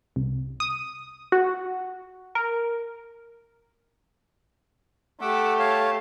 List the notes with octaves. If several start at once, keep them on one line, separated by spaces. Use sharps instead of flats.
C2
D#6
F#4
A#4
A3 G4 F#5 D6 E6
C#5 F5 A5